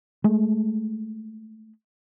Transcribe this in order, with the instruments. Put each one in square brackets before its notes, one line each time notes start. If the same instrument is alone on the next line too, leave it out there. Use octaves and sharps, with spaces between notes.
[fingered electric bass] G#3 A3